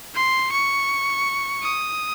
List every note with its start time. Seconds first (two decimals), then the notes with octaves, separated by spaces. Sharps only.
0.15 C6
0.52 C#6
1.62 D#6